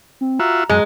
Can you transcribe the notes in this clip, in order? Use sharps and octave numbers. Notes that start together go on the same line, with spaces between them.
C4
F4 F#4 E5 A#5
F#2 G#3